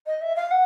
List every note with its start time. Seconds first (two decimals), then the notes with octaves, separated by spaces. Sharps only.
0.06 D#5
0.21 E5
0.36 F5
0.50 F#5